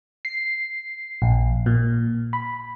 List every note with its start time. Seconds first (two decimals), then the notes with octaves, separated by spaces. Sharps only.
0.25 C7
1.22 A#1
1.66 A#2
2.33 B5